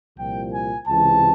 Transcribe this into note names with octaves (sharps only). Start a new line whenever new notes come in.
C2 A#2 F3 G5
G#5
C#2 C3 E3 A5